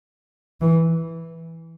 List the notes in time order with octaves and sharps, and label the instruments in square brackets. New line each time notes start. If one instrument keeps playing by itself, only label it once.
[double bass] E3